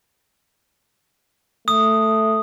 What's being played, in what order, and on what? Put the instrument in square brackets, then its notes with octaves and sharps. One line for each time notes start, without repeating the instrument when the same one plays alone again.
[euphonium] A3 [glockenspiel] D#6